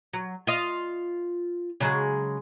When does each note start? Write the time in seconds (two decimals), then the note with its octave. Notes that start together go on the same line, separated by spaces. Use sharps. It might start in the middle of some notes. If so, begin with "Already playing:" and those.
0.13 F#3
0.47 F4 D#5
1.80 C#3 F#3 G#3